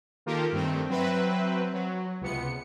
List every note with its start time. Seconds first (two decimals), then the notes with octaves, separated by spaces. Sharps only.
0.26 D#3 A#3 F4 G4 A4 A#4
0.52 G2 D#3 A3 C4
0.89 F#3 C4 B4 E5
1.73 F#3
2.21 C#2 C3 B3 C#7